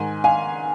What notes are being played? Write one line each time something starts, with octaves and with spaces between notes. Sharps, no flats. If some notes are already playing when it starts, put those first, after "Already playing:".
Already playing: G#2 D#3 G#5
F5 G#5